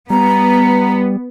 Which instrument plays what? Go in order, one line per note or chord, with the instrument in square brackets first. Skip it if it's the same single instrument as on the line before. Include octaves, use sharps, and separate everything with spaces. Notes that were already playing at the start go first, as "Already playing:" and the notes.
[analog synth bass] G3 [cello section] B3 [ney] A#5